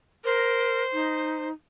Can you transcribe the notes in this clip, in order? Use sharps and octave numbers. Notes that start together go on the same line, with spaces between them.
A#4 C5
D#4